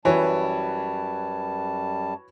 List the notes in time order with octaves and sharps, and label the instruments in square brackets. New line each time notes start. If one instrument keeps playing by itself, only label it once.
[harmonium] F#2 G3 A5 [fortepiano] E3 [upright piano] F#4 B4 C#5